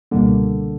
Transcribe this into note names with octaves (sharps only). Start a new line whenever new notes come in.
C#2 B2 D3 G3 A#3